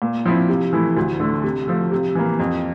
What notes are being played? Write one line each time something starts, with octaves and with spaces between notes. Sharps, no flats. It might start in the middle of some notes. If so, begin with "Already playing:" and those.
A#2
F3 C4 E4
C3
E3 A3 E4
D2
D3 A3
C3
F3 A3
C3
E3 A#3
F2